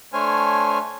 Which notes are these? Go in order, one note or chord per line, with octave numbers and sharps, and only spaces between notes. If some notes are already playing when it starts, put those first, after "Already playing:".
A3 D4 C5 C#5 G#5 F6